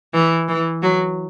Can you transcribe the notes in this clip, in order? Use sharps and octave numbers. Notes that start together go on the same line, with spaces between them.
E3
E3
F#3